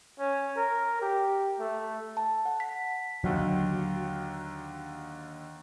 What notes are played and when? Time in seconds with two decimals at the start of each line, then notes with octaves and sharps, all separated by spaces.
0.19 C#4
0.57 A#4
1.02 G4
1.60 A3
2.17 A5
2.45 F#5
2.60 B6
3.24 D#2 D3 D#3 F#3